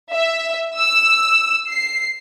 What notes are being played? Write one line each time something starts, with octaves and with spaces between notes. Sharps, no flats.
E5
E6
C7